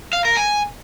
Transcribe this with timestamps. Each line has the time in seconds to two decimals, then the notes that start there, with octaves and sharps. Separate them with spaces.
0.13 F5
0.25 A#4
0.37 G#5